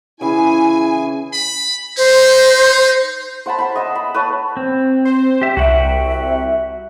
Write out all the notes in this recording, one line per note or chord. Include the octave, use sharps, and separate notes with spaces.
C#3 E3 E4 G#4 G#5
B5
D#4 C5
C5 F#5 A5 B5
C5 B5
D#5 F#5 E6
B5
B4 C#5 A5
C4
C5
G4 E5
C2 F#4 E5 F#5 G5